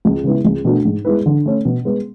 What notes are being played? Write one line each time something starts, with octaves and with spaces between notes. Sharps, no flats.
C#2
C#3 G#3 B3 E4
C#2
B2 A3 D4 F#4
G#2
G#3 B3 E4 B4
D3
A3 C#4
B2
G#3 B3